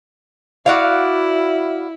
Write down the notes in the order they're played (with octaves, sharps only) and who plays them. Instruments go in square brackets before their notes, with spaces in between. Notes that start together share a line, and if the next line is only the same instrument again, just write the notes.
[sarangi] E4 [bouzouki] F#4 D5 F5